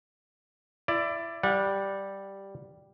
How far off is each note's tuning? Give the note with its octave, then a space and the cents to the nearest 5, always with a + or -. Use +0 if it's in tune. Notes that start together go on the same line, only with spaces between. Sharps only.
E4 +25 D5 +5
G3 +0 F#5 -30